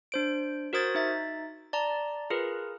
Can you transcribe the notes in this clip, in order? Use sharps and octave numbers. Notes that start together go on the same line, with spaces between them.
D4 C5 D7
F#4 A#4 C5 D#6 G#6 A6
D#4 E5 A6
D5 A5 A#5
F4 G#4 A#4 B4